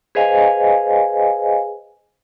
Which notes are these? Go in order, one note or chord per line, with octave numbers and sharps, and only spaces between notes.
G#4 B4 C5 D#5 F5 G#5